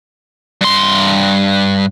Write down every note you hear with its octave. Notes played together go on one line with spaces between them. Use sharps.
G2 C6